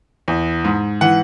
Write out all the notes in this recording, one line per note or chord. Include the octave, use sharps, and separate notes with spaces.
E2
G#2
E3 F#5